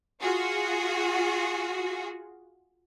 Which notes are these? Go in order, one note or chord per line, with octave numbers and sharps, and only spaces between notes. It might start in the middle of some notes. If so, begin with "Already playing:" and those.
F4 F#4 G#4